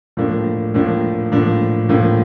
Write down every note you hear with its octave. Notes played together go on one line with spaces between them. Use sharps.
A2 F3 A#3 D4
A2 F3 A#3 D4
A2 F3 A#3 D4
A2 F3 A#3 D4